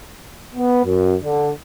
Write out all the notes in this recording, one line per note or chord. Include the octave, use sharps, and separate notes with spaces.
B3
F#2
D3